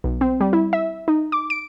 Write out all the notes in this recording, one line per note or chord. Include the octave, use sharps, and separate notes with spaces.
B1
C4
G3
E4
E5
D#4
D6
D7